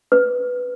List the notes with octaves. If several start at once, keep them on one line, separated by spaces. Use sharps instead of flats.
B4